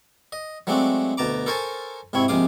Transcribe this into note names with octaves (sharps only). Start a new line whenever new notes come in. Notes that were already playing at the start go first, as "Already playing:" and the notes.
D#5
F#3 G#3 A3 C4 D4
D2 B2 A5 A#5 D6
A4 A#4 C5 C#5 G#5 A5
G#2 C3 C4 E4 C#5
A#1 C3 G#3 F5 D6 D#6